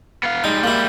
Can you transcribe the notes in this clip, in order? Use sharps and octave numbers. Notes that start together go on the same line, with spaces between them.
B3 F5
G3 G#3 D#4
A#3 E4